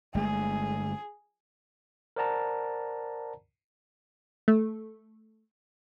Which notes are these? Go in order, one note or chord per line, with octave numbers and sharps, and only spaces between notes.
G1 G#3 A3 G#4
A#4 C5 D5 F#5 A5 A#5
A3